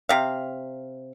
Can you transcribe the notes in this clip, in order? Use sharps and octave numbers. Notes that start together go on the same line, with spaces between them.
C3 F5